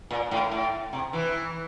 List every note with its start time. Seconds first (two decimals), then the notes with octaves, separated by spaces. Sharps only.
0.11 A#2
0.31 A2
0.51 A2
0.93 C3
1.13 E3